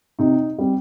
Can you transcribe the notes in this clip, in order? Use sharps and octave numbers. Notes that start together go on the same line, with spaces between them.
C3 D#4
G3 C4